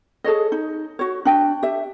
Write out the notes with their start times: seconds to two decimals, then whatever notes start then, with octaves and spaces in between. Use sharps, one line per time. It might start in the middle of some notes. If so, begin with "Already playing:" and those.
0.24 G#4 A4 C#5 D#5
0.52 D#4
0.99 F#4 C#5
1.25 D4 G5
1.63 G4 E5